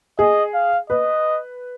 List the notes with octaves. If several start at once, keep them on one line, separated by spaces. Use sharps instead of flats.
G#4 D#5
F5
B4 D#5